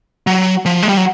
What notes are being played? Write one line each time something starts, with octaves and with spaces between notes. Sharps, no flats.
F#3
F3
G#3
G3
F#3